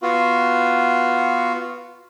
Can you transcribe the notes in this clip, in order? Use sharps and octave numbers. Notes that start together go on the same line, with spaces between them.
B3 F4 F#4